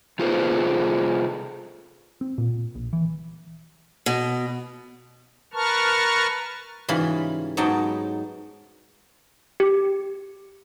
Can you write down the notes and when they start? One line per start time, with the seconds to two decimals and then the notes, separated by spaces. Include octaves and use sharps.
0.19 C3 F4 G#4 A4 B4 C5
2.21 C4
2.38 A#2
2.75 A#1
2.93 E3
4.06 B2
5.54 A#4 B4 A5 A#5 C#6 F6
6.88 G#2 C#3 E3 G3 F4 B5
7.57 G#2 F#3 B3 D#4 G5 A5
9.60 G4